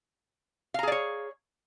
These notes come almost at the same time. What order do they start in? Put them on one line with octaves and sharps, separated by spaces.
F5 A#5 G#4 D5 C#5